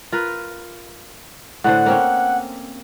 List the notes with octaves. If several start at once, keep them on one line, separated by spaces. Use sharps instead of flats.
F4 A#4 B4
A2 D3 C5 F#5
A#3 C4 C#4